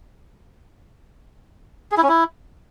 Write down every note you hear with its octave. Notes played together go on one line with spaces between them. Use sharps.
G#4
E4
C#4
E4